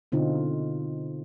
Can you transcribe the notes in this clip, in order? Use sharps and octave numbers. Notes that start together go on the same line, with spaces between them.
B2 D3 C4 D#4 F4